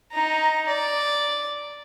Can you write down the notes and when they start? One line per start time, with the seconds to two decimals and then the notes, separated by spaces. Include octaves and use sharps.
0.12 D#4 A#5
0.68 D5